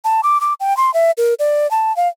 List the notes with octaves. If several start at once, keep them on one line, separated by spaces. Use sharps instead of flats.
A5
D6
D6
G5
C6
E5
A#4
D5
A5
F5